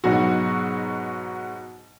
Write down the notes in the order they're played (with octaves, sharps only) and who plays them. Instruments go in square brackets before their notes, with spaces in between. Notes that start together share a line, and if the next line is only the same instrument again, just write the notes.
[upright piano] G#2 B2 F#3 F#4